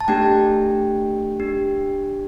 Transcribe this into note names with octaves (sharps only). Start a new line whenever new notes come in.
A5
A3 D4 G4 G5
D4 G4